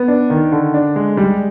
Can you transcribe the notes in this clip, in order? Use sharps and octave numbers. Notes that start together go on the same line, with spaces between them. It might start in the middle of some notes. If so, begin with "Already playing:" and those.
Already playing: B3
D4
D#3
D3
D4
G#3
G3